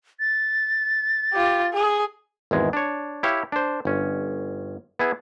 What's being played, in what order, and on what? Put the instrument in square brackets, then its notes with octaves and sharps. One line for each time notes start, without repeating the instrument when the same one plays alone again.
[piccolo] A6
[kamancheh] F4 G4
G#4
[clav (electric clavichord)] G#1 E2 G#3
D4 C#5
E4 G4 C#5 F5
D4 C5
G1 C#4
B3 E4 G#4